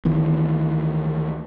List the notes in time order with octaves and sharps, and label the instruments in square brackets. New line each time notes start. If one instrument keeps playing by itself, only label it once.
[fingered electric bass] D2 D#3 E3 B3